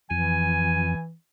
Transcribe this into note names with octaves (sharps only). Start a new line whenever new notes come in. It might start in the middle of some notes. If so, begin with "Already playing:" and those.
F2 E3 G#5